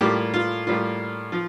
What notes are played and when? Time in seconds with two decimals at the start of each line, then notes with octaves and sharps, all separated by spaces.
0.01 A2 G3 A#3 F4 G4
0.34 F4
0.67 A2 G3 A#3 F4
1.32 F3 F4